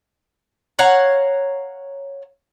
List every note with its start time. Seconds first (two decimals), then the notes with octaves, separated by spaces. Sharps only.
0.79 C#5 F5 F#5 A#5